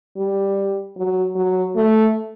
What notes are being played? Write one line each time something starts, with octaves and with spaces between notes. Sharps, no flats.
G3
F#3
F#3
A3